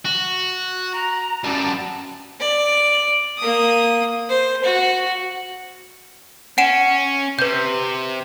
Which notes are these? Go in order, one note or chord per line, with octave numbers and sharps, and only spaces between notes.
F#4
A#5
F#2 G3 A5
D5
A#3 D#6
C5
F#4
C#4 F#5 D7 E7
C3 B4 G6